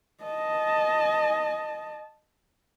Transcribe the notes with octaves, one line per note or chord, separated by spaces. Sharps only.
D#5 A5